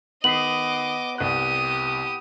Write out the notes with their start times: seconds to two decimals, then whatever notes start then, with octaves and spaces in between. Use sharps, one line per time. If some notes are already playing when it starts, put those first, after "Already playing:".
0.24 D#3 B3 D#5 D6 B6 C7 F#7
1.18 C2 G4 D#6 F#6